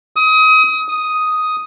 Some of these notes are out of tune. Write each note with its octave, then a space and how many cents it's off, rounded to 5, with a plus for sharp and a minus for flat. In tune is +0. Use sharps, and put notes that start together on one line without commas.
D#6 +30
D#6 +5